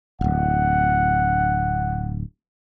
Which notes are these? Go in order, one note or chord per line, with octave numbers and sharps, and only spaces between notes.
D1 G#1 F#5